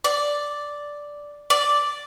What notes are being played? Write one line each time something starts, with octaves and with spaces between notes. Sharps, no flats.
D5
D5